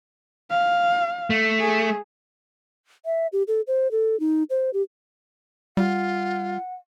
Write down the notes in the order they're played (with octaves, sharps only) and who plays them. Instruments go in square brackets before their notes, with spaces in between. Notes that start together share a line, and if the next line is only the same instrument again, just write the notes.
[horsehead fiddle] F5
[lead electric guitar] A3
[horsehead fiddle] G#4
[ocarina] E5
G4
A4
C5
A4
D#4
C5
G4
[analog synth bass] G3 [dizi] F4 [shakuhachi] F#5